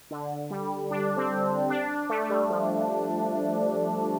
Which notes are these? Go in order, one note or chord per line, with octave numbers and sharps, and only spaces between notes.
D3
G3
D4
C4
D4
A3
A3
G3
F3